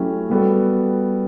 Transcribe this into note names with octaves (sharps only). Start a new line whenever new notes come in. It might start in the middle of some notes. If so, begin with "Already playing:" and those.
Already playing: F#3 A3 C#4 E4 G4
G3 B3 F#4 A4